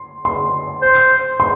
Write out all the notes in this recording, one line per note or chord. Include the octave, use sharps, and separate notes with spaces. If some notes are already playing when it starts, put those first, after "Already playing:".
Already playing: C6
C6
C5
C6